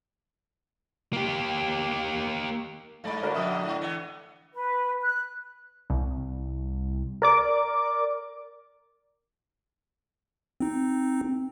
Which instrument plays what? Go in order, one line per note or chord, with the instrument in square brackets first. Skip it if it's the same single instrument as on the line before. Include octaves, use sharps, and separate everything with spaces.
[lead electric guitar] A#3 G4
[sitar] G2 G#3 D5 [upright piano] A3 B5
[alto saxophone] D3 [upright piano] F#4 A#4 B4
[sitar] F2 G#2 B2 [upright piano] E5 D#6
[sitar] G#2
E3 B3
[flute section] B4
F#6
[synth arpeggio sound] C2
A#4 D5 D6
[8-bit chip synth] C4 D#4